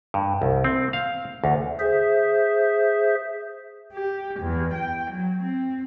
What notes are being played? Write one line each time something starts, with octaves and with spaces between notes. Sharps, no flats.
G2
C2
C4
F5
D2
G#4 C5 E5
G4
E2
G5
F#3
C4